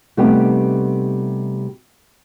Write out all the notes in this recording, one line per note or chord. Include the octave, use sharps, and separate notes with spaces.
C3 G3 A3 B3 D#4 G4